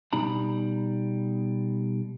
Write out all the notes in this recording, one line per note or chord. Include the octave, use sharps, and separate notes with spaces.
B2 G3 D#4 A#5 B5